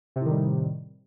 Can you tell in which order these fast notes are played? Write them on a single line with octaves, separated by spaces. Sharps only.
C3 A2 D#3 G3